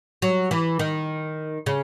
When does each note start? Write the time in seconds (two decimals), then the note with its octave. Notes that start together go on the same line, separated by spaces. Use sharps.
0.22 F#3
0.51 E3
0.79 D#3
1.66 C#3